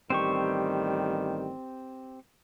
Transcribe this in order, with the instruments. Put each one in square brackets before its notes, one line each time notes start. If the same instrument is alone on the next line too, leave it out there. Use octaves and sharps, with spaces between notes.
[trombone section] A1 D#3 G3 [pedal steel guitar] C4 G4 C#6